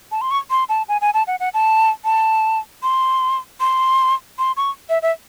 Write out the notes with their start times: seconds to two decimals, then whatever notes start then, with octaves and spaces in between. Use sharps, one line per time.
0.12 A5
0.21 C6
0.31 C#6
0.50 C6
0.69 A5
0.89 G#5
1.01 G#5
1.14 A5
1.27 F#5
1.40 F#5
1.54 A5
2.05 A5
2.83 C6
3.60 C6
4.39 C6
4.57 C#6
4.89 E5
5.02 E5